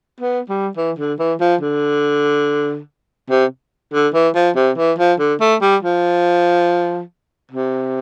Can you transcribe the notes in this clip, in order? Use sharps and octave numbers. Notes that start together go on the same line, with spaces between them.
B3
G3
E3
D3
E3
F3
D3
C3
D3
E3
F3
C3
E3
F3
D3
A3
G3
F3
C3